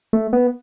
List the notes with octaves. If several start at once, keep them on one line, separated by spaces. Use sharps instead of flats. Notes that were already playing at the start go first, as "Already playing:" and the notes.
A3
B3